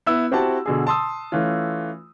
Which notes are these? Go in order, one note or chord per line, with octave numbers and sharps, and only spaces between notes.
B3 E4 E6
C4 E4 F#4 G4 F#5 A5
B2 D3 G#4
A5 C6 D#6 E6
E3 A3 C#4 F4